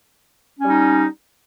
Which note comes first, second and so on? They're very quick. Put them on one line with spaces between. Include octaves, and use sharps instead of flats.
C#4 G3 D#4